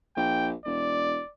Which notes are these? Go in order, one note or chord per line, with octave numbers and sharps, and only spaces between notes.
A#1 G5
E1 D5